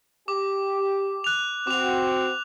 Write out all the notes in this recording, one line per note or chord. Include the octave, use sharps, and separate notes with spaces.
G4 D6
F#6 F7
C4 F#4 D6 F7